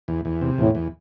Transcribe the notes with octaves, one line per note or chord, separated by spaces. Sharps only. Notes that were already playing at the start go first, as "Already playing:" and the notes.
E2
E2
C3
E2 A2
E2